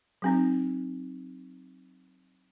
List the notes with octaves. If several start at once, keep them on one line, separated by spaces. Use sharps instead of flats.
F#3 C4 D#4